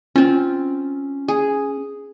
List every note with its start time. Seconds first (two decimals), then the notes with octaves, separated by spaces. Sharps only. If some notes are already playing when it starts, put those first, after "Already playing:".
0.16 C4 C#4 F4
1.28 G#4